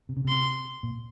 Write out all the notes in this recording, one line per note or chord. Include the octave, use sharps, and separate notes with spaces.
C3
C#3
C3 C6
A#2